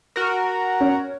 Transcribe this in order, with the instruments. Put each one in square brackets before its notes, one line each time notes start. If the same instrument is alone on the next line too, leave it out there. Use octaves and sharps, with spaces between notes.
[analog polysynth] F#4 A#4
[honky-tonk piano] C#4